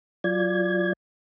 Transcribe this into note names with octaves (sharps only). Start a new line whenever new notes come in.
F#3 F4 D5 G#6